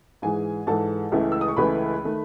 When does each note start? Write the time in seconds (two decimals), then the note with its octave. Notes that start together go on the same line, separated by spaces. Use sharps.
0.22 G#2 E3 G#3 G#4 G#5
0.67 G#2 E3 G#3 A4 A5
1.12 C#2 C#3 E3 A3 E4
1.32 E6
1.41 D#6
1.48 C#6
1.57 C#2 C#3 E3 A3 E4 B4 B5
2.04 D#3 A3